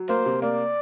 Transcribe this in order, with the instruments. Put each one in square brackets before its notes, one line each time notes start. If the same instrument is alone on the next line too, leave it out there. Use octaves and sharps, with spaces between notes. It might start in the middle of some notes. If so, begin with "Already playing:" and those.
Already playing: [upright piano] F#3
[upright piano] A#3 [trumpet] C5
[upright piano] C3
[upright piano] A#3 [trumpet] D5